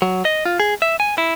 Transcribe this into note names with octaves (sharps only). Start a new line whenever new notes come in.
F#3
D#5
F4
G#4
E5
G#5
E4